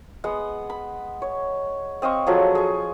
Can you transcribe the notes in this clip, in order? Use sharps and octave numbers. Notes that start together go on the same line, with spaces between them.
G#3 B3 F#5
B5
C#5
C4 D#5 F5 C#6
F3 F#3 G#4 A4
G#4 C#6